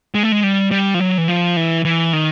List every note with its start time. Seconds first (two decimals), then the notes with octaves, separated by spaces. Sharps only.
0.15 G#3
0.23 A3
0.32 G#3
0.43 G3
0.71 G3
0.94 F3
1.00 F#3
1.18 E3
1.28 F3
1.57 E3
1.85 E3
2.13 D#3